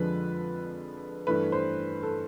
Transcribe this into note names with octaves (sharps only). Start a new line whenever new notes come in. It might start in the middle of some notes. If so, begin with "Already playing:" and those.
Already playing: F2 D3 F3 G#3 B4
G2 E3 A3 B4
C5
A4